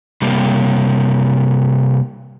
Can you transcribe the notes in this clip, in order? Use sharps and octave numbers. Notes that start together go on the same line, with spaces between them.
C3 G3 A#3